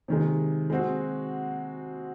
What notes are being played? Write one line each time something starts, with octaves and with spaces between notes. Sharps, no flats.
C3 D#3 G#3
G#3 C4 F#4